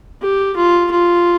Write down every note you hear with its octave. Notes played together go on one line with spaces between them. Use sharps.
G4
F4
F4